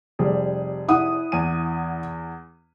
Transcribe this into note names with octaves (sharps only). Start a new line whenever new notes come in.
F1 G3 G#4
E4 F#5 D#6
E2 G#5 D#7